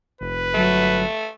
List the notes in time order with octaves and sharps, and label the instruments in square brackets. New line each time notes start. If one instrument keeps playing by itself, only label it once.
[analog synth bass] F1 [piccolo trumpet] B4
[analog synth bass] G1 [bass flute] F#3 [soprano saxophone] A3